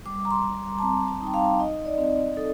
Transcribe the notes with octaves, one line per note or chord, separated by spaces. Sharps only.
G3 D6
A#5
C6
G3
A5
C4 A#5
A5
D#4
G5
F5
D#4 D#5
D5
C4
D#4 A4